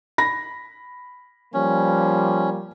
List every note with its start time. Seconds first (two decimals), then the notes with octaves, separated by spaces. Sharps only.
0.18 B5 A#6
1.54 F3 G3 A#3 C#4